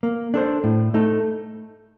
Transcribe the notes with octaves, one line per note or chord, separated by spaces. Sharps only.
A#3
D4 A4 C5
A2
A3 D#4 A4